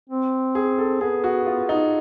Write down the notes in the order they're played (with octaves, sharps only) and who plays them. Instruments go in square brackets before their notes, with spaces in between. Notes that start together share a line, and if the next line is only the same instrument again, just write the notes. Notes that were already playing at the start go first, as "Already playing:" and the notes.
[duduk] C4
[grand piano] G#4
A4
[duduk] B3 [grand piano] G#4
[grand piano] F#4
F4
D#4